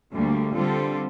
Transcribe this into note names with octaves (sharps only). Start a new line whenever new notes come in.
D2 D3 G3 A#3
D3 G3 C4 F4 A4